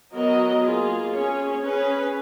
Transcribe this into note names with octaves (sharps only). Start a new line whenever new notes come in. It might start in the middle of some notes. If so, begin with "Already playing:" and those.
F#3 B3 F#4 A#4 D#5
A#3 F4 G#4
C#4 G#4 C#5
C#4 G#4 B4